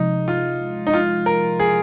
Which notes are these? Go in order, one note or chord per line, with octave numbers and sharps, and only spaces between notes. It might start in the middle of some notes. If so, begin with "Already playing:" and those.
Already playing: C3 F3 G#3 D#4
F4
D#4
F4
A#4
G#4